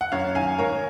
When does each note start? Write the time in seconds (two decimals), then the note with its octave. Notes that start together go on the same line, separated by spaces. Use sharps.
0.01 F#5
0.12 F#2 C#5 F5
0.35 D#3 F5 G#5
0.58 G#2 A#4 C#5